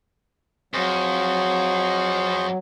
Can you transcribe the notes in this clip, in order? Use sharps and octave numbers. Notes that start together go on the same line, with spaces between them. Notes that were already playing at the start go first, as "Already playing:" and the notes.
F2 F#3 G#4 C5 C#6